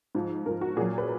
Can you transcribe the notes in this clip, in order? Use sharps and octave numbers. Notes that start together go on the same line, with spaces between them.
G#2 F3
G#2 F3 A#4
F#4
A#2 F#3 G#4
B4